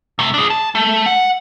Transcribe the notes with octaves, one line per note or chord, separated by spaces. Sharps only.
C3 A3
D4 G#4
A5
A3
F#5